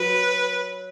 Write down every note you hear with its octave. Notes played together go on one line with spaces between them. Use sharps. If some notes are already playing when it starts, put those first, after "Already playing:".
Already playing: F#3 B4